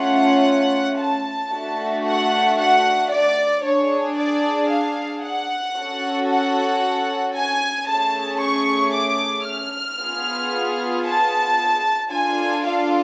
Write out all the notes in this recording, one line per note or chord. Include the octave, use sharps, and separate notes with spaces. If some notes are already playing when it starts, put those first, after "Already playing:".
Already playing: A3 C#4 F4 F#5
A5
A3 D4 F#4
F#5
F#5
D5
D4 G#4 C#5
D5
F5
F#5
C#4 F#4 A4
F#5
G#5
A3 C#4 G#4 A5
C#6
D6
F6
B3 F4 G#4
A5
D4 F4 A4 G#5
F5